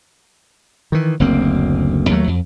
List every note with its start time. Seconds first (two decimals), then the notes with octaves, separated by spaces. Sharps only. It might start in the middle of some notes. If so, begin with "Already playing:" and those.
0.92 D#3 E3
1.20 F#1 D2 A#3 C4
2.09 D#2 F#3 A3
2.27 F2